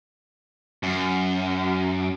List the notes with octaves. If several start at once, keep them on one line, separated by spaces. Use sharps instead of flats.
F#2